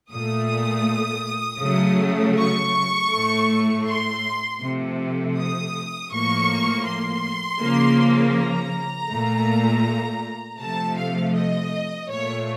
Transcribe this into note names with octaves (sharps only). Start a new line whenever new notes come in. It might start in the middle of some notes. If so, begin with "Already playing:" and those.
A#2 A3 D#6
C#3 F#3 A3
C#6
A2 A3
C6
C3 F3 A3
D#6
A2 F3 A#3 C#6
C6
C#3 F3 A#3
A#5
A#2 A3
C3 F3 A3 A5
F5
D#5
A#2 A3 C#5